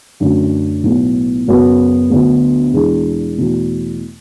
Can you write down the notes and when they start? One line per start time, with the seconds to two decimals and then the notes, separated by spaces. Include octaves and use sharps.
0.20 F#2 D3 F#3 A3 C#4
0.83 B1 A2 F#3 B3
1.47 F#2 C#3 F#3 B3 F#4
2.10 D2 D3 F#3 B3
2.73 E2 B2 G#3 D4 G#4
3.36 E2 B2 A3